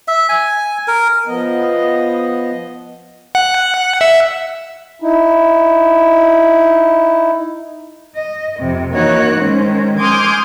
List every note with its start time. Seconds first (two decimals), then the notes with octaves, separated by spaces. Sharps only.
0.08 E5
0.29 G#5
0.88 A#4
1.27 F3 B3 D#5
3.35 F#5
4.01 E5
5.02 D#4 E4
8.16 D#5
8.60 F2 C3
8.92 E3 A#3 D#4 F#4 C#5 F#6
9.39 D#3 G#3 C#4 C5
9.98 G#5 C6 D6 D#6 F6 G6